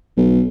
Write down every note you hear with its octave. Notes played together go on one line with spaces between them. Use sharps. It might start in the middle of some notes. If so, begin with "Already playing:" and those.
B1